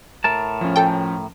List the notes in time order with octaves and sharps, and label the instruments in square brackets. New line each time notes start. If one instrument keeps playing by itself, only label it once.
[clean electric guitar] A2 A#4 A5
[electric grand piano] F3 C#4
[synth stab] A4 G5